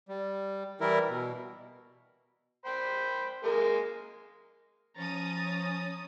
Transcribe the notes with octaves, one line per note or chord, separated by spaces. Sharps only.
G3
E3 G3 E4 A#4
B2
C5 G5 B5
G#3 A#3 A#4
F3 C#4 A#5 D#6 A6